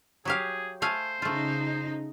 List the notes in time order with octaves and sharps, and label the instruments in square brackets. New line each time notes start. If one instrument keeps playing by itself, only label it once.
[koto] F#3 G4 F5 [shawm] G#4
[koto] A3 F5 G#5 [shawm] C5
[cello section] C#3 D#4 [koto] A3 F4